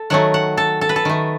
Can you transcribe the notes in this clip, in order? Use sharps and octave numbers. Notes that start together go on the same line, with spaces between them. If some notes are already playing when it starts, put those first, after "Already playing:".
Already playing: A4
D#3 F#3 A3 F#5
F#5
A4
A4
B4
A4
D#3 A3